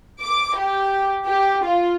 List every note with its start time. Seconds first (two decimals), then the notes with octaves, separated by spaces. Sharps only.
0.21 D6
0.57 G4
1.26 G4
1.64 F4